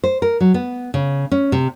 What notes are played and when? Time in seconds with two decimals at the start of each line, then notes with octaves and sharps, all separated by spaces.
0.04 C5
0.22 A#4
0.41 F#3
0.54 B3
0.94 C#3
1.32 C#4
1.52 C3